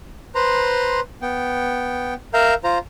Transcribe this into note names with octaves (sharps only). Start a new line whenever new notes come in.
B4 C5 A#5 C6
B3 G5
A#4 E5 F5 A#5 G6
F4 C5 A#5